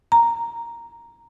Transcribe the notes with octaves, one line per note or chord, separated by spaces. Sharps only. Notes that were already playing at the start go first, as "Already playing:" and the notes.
A#5